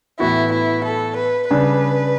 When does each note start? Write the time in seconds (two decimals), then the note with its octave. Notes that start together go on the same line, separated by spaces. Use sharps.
0.20 A2 E3 B3 E4 F#4
0.52 E4
0.85 A4
1.17 B4
1.50 C#3 G3 D4 B4